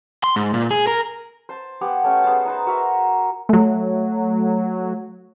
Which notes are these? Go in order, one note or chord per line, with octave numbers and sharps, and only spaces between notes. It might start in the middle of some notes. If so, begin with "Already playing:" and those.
C6
G#2
A#2
G#4
A#4
C5 A5
B3 G4 F#5 G#5
A3 C#4
B3 G#4 C5 A5
D#4 B4 C5
F#4 A#4 E5 A#5
F#3 A3